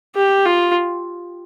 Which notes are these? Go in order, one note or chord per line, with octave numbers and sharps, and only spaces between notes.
G4
F4